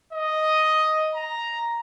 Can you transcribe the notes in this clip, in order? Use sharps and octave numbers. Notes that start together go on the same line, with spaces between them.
D#5
A#5